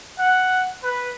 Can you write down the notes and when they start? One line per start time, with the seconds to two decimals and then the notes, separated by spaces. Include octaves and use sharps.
0.18 F#5
0.83 B4